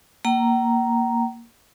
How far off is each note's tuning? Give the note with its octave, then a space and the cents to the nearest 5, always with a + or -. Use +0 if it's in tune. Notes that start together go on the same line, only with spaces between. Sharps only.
A#3 +0 G5 -45 A#5 +0